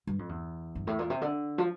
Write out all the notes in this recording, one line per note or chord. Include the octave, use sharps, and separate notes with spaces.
G2
F2
E2
G2
A2
A#2
C3
D3
F3